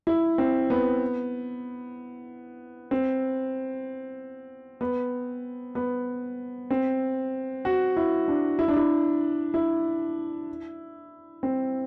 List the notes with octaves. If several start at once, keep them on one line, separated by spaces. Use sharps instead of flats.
E4
C4
B3
C4
B3
B3
C4
F#4
E4
D4
E4
D4
E4
E4
C4